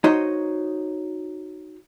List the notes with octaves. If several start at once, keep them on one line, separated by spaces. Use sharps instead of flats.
D#4 F#4 C5 C#5 D#5